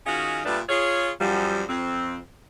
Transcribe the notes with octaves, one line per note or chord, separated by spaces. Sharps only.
D#3 C#4 F4 F#4 G#4 D#5
A#2 G3 A3 B3 D4
F4 G#4 C#5
F#2 F3 G3
F2 C4